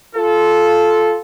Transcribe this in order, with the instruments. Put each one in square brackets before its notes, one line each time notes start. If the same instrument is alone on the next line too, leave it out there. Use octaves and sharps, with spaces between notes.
[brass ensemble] F4 A4